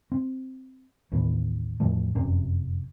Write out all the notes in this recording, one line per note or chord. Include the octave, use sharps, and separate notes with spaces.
C4
A1 D#2 A2 B3
E2 A2 F3 A3
F1 F#2 C3 C#4